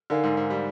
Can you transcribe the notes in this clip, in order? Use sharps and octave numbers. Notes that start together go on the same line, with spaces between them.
D3 D#4 A#4 F5 G#5
G#2
G#2
G3